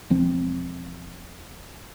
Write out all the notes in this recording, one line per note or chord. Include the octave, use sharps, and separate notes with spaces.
E1 F3 C4